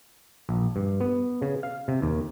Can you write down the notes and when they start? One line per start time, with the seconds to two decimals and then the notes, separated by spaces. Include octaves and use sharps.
0.49 A#1
0.76 G2
1.01 B3
1.42 C#3
1.63 F5
1.88 C3
2.02 D#2